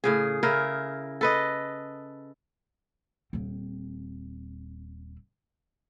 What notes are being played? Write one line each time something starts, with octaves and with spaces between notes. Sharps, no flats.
A2 C#3 G#4
C#3 E4 A#4
A4 B4 D#5
D#1 C4